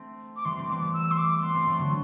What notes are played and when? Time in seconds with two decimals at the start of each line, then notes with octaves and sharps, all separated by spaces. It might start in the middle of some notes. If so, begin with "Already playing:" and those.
Already playing: A3 C4
0.36 D6
0.45 E3 G3 C6
0.57 A3 C4
0.69 G3 B3 D6
0.82 G3 B3
0.93 E6
1.11 C6
1.18 D6
1.42 G3 B3 C6
1.54 A3 C4
1.67 F#3 A3
1.79 D3 F#3